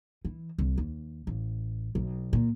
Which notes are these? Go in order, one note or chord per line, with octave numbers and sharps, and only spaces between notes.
E3
C2
D#2
A1
B1
A#2